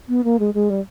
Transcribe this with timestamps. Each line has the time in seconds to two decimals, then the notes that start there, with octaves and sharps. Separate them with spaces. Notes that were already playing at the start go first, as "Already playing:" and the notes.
0.09 B3
0.24 A#3
0.39 G#3
0.54 G#3
0.70 G3